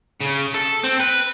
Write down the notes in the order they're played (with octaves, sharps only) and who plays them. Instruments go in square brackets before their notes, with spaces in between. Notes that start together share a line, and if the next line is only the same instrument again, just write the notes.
[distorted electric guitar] C#3
A4
C4
B4